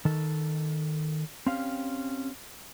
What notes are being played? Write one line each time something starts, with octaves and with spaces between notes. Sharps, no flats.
D#3 A4
C4 C#4 G4 F5